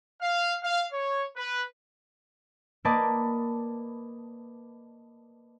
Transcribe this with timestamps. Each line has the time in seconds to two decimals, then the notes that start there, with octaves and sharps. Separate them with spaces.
0.20 F5
0.63 F5
0.92 C#5
1.36 B4
2.85 A#3 A#4 B4 D5 D#5 A5